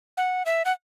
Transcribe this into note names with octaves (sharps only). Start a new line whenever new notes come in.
F#5
E5
F#5